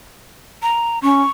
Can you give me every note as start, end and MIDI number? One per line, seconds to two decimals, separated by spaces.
0.62 0.99 82
1.03 1.22 61
1.03 1.30 85